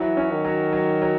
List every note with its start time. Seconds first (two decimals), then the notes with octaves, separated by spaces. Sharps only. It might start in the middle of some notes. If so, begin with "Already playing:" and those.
Already playing: E3 F#3
0.17 C#4
0.31 D#3
0.45 F#3
0.73 F#3
1.02 F#3